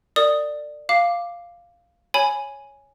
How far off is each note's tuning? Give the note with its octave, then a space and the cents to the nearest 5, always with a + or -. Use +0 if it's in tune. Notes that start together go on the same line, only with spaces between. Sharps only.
A#4 -35 D5 +15 D#6 +0
F5 -5 D6 +0
C#5 +0 G#5 +0 B5 +0